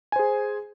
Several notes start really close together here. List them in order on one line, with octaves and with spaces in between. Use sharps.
G#5 C5 G#4